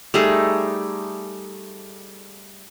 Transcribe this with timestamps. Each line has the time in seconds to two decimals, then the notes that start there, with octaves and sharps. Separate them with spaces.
0.14 G3 A3 D#4 G#4